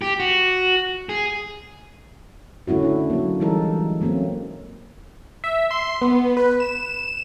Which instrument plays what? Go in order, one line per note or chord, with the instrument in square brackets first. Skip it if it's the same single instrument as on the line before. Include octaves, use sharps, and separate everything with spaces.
[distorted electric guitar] G4
F#4
G#4
[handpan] D3 A3 C#4 E4 F#4
D4 E4
F#3 A#3
E3 G3 G#3 D#4 A4 A#4
F#3 A3 A#3 C4 C#4
[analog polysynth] E5
C6
B3
B4
E7